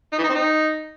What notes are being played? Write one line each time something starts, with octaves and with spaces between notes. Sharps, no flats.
D#4
E3
D#4
C4
D#4